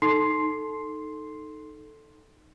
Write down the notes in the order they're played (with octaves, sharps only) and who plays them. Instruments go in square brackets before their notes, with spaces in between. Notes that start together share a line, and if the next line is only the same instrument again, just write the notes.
[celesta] D#4 A4 C6 C7